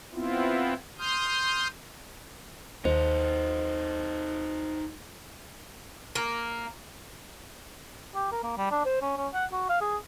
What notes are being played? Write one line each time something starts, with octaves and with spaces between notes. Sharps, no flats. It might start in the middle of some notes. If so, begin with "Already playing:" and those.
B3 C4 E4 F4
C6 D#6 F6 G6
D#2 D#4 A4 C5
A#3
G4
A#4
A#3
G3
D4
C5
C#4
C#4
F#5
F#4
F5
G#4